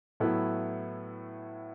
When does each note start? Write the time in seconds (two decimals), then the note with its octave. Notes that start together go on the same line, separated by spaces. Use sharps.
0.20 A2 F#3 B3 E4 A4